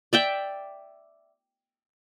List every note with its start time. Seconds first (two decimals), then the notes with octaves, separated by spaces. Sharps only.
0.13 D5 E5 G5